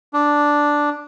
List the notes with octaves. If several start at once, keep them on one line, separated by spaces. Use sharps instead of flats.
D4